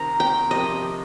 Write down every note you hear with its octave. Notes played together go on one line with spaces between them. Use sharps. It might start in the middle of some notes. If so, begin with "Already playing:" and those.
Already playing: C3 D#3 C4 A#5
G5
C3 F3 C4 G4 A#4 D#5